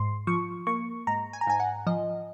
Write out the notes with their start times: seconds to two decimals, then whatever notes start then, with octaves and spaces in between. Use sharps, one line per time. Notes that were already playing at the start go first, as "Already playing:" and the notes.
Already playing: G#2 C6
0.27 F3 C#6
0.67 A#3 C#6
1.07 G#2 A#5
1.33 G#5
1.41 A#5
1.47 G#2 G#5
1.60 F#5
1.87 F3 D#5